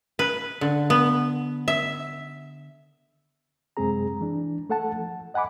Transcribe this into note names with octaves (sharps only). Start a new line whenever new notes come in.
B4
D3
B3
E5
F#2 C3 G#3 C4 G#4 A#5
E3 D4
A3 A4 F#5 A5
F3
D#5 F#5 G#5 B5 D6